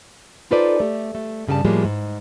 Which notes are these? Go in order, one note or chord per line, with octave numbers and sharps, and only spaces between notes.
D#4 F4 A4 B4 C5 D5
A3 G4
A3
G2 C#3 G3 G#5 A5
A2 F3 G3 G#3 A#3
G#2